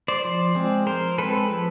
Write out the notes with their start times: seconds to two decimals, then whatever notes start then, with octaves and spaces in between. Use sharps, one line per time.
0.08 C5 D5
0.24 F3
0.55 G#3 C4
0.87 F3 A#4 C5
1.18 G#3 C4 A4 B4
1.50 F3